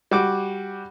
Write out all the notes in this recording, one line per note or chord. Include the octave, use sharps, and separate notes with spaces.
G3 F#4 D6